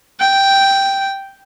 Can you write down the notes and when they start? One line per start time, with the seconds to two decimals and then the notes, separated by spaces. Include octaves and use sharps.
0.20 G5